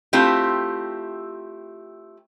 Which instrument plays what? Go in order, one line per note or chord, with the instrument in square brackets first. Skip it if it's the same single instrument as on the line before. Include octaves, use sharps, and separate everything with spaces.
[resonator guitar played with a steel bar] A3 C4 E4 F4 G4